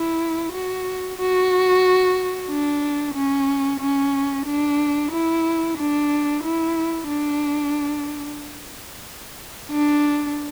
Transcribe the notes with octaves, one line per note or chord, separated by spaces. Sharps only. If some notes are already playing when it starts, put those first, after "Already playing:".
Already playing: E4
F#4
F#4
D4
C#4
C#4
D4
E4
D4
E4
D4
D4